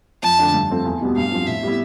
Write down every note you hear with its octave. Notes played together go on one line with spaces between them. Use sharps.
F2 A5
D3 A3 D4
G2
F3 A3 C4
E2
B2 G3 B3
G2 F5
F3 C4
A2 E5
G3 B3 E4